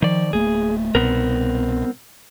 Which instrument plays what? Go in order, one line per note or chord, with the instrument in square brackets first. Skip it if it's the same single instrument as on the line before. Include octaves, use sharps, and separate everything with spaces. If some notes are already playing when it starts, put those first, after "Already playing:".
[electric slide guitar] D#3 D5 [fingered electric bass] F3
[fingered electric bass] D1 A3 A#3 [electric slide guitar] G#4
[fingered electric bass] C2 B2 [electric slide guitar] B3 C4 A#4